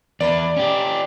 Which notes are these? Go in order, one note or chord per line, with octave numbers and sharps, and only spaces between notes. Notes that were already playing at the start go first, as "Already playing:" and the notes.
E2 B4 D5
C#4 G4